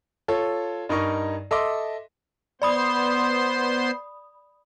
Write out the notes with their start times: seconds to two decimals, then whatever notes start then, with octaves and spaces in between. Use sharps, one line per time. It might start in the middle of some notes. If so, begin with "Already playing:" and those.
0.28 F4 A4 C#5
0.89 G2 D#4 A#4 D#5 C#6
1.51 A4 D#5 E5 C6 D6
2.62 B3 C5 D5 B5 C6 D#6